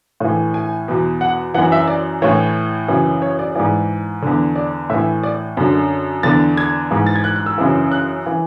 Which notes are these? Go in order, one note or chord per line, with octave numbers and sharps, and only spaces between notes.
A2 E3
G#5
E2 B2
F#5
F#2 E3 F#5
E5
D5
A2 E3 C#5
F#2 C#3 E3
C#5
D5
G#2 E3 D5
E2 D3
D5
A2 E3 E5
D5
F#2 D3
E2 D3 A6
G#6
G#2 E3
A6
G#6
F#6
F#6
E6
F#2 C#3 E3
F#6
E3